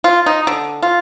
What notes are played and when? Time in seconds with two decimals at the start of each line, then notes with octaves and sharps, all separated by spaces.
0.04 F4
0.26 D#4
0.47 D3
0.82 F4